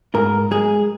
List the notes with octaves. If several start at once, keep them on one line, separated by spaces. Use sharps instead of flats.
G#2 A#4
G#3 G#4